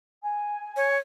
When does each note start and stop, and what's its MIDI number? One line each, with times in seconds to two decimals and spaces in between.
0.23 0.93 80
0.76 0.98 73